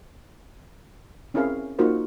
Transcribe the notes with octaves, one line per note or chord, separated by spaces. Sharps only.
C4 C#4 E4 G#4 A#4 F5
A#3 D#4 F4 F#4 A#4 C5